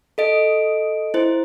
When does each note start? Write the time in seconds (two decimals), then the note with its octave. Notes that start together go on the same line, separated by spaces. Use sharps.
0.18 A4 D#5 D7
1.14 E4 C5